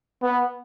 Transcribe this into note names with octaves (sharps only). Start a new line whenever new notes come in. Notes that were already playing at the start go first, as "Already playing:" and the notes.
B3